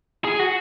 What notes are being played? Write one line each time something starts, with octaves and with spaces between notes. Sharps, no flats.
G#4
F#4